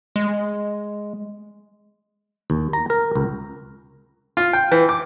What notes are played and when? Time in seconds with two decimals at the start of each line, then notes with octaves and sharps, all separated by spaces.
0.16 G#3
2.50 D#2
2.73 A#5
2.90 A#4
3.15 C#2
4.37 F4
4.53 G5
4.72 E3
4.89 D6